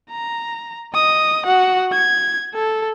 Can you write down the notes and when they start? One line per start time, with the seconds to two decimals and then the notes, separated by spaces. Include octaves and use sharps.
0.11 A#5
0.94 D#5 D#6
1.46 F#4 F#5
1.92 G#6
2.55 A4